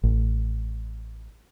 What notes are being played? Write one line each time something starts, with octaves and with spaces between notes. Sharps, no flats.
A1